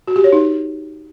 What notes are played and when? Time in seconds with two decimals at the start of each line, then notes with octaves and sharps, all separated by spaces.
0.08 F#4
0.16 G4
0.24 C#5
0.32 D#4